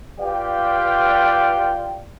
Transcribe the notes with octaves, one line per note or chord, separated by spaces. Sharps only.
F4 G4 B4 D5 F5 G5